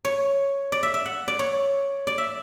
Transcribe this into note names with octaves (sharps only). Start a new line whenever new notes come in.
C#5
D5
E5
E5
F#5
D5
C#5
D5
E5